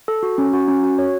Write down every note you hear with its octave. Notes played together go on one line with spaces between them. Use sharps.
A4
F#4
C#4
F#4
C#4
F#4
C#5